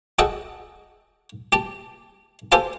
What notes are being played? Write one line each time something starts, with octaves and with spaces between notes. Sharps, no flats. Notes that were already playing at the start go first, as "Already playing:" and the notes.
F#4 G#4 A4 D#5 F#5 G5
G4 G5 A5
G4 A4 C5 F5 G#5 A5